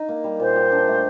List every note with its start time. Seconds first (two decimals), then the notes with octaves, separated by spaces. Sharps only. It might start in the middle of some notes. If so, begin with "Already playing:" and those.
Already playing: D#4
0.09 A#3
0.24 G3
0.40 A#2 C5
0.56 G4
0.72 D4
0.88 A3